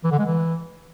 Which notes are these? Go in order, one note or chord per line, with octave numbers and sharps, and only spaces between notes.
E3
D3
G#3
E3